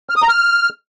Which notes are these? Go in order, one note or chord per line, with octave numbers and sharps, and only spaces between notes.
F6
D#6
A#5
F6